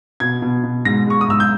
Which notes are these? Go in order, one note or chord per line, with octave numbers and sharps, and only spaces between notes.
B2 G#6
B2
B2
G#2 A#6
G#3 C#6
D#6
G#2 E6
G6